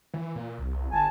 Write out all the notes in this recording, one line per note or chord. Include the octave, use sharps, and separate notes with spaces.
E3
A#2
C2
G1 G#5 A5